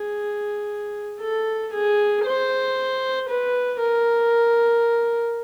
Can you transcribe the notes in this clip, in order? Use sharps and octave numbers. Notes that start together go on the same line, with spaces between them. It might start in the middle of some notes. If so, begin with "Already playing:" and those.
Already playing: G#4
A4
G#4
C5
B4
A#4